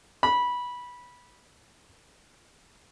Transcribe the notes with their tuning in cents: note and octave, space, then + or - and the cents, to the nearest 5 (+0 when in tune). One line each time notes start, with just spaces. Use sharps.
B5 -15